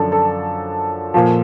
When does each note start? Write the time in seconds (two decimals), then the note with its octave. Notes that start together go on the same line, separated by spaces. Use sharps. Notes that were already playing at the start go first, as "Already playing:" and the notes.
Already playing: F#2 D3 F3 A4 D5
0.12 A4
1.14 A#2 F3